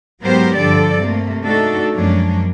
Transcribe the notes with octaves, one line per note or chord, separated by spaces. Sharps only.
G#2 F#3 B3 G4 A#4 C5
G2 D3 F3 A4 D5
C3 A3 A#3
A3 D4 D#4 F#4 A4
F#2 F3 G#3 A#3 C#4 D4